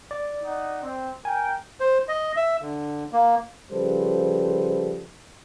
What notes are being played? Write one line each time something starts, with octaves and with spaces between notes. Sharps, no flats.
D5
D#4 D#5 F#5
C4
A#4 G5 G#5
C5
D#5
E5
D3
A#3
C#3 F3 G3 A4 B4 C5